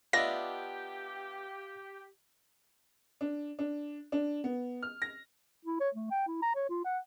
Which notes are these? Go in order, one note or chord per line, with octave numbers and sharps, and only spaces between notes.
B3 D4 F4 G4 D#5 E5 A#6
D4
D4
D4
B3
F6
A#6
E4
C#5
A3
G5
E4
A#5
C#5
F4
F#5